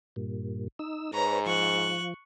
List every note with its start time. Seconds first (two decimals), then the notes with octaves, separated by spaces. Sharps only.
0.16 G2 A#2
0.79 D#4 E6
1.14 G#2 B4 C#5 A#5
1.46 F3 C#6 F#6